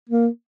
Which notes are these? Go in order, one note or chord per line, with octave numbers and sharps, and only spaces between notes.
A#3